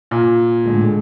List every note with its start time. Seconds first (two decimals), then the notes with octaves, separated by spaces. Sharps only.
0.11 A#2
0.64 A2 D3 G#3